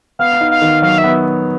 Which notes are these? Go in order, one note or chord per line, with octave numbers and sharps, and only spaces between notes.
B3 F5
D#4
F5
D#3
F#3 F5
E5
B3